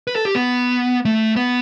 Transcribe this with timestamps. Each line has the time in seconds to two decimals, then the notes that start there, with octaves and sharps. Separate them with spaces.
0.07 B4
0.16 A4
0.25 G4
0.35 B3
1.05 A3
1.36 B3